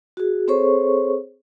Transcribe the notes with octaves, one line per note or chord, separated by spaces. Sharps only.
F#4 G#4
C4 G#4 A4 C5 C#5 C#6